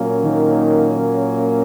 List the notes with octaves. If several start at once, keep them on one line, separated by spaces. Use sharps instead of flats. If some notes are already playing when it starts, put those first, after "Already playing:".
Already playing: A#2 F#3 A#3 C#4
D#3